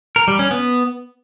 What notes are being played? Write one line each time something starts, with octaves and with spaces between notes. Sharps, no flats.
A#4
G3
C#4
B3